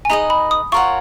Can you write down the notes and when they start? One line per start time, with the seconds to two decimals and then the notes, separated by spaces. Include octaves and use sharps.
0.05 G#5
0.10 D#4 G#4 B4 D#5 A#5
0.30 B5
0.51 D#6
0.72 F4 A#4 C#5 F#5 C#6